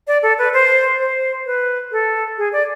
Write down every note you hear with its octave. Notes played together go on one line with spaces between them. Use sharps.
D5
A4
B4
C5
C5
B4
A4
G#4
D5